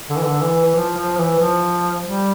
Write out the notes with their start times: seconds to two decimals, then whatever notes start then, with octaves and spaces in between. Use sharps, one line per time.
0.09 D3
0.17 E3
0.25 D3
0.42 E3
0.65 E3
0.75 F3
0.97 F3
1.18 E3
1.39 F3
2.04 G3